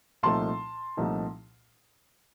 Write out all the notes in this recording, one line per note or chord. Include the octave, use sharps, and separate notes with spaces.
C2 A#2 F3 A3 D#4 A5 C6
C2 A#2 F3 A3 D#4